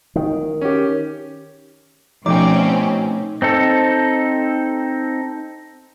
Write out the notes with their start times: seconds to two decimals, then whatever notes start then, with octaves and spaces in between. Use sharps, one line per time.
0.16 D#3
0.61 C#4 G4
2.26 B2 F3 A3 C4 C#4 D#4 G5 D6
3.42 C4 D#4 A4